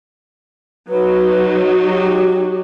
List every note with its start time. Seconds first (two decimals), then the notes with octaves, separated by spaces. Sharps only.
0.89 F#3 D#4 B4
1.86 G4